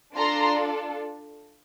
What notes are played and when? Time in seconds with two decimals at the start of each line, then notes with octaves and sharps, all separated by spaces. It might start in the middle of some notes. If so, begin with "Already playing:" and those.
0.15 D4 F4 A4 A#5 C6